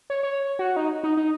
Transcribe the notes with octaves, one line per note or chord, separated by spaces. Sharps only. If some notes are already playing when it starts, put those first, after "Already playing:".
C#5
C#5
F#4
D#4
D#4
D#4